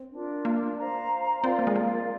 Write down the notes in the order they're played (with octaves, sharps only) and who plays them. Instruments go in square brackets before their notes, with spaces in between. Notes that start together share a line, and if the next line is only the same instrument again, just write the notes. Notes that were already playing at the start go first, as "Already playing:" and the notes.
Already playing: [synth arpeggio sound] C4
[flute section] D4 F4 A#4
[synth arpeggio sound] A#3
[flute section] C5 F5 A#5
[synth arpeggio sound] C4 [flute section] F4 A#4 D5 F5
[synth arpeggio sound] A#3
G#3
A#3